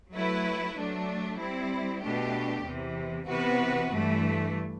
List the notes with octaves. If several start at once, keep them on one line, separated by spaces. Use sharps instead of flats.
F#3 A3 E4 B4
F#3 A3 D4
G3 C4 E4
B2 A3 D4 G4
E2 C3 E3
C3 E3 B3 F#4 B4
G2 E3 A3